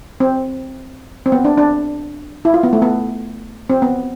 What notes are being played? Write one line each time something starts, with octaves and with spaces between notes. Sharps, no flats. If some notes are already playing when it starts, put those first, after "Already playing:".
C4
C4
B3
D4
D4
E4
F4
B3
A3
B3
C4
B3